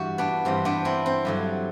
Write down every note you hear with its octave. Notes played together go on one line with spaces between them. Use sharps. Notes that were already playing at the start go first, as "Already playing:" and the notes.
Already playing: G2 E3 G3 F#4
B3 D4
G2 E3 G3 C4
B3 D4
C4 E4
C4
G2 D3 F#3